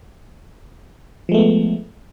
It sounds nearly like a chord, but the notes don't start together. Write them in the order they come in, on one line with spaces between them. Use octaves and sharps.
F3 G#3 A3 B3